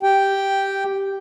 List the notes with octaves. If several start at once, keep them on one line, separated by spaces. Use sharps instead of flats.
G4 G5